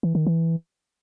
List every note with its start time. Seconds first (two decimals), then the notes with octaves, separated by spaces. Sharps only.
0.03 E3
0.15 D#3
0.27 E3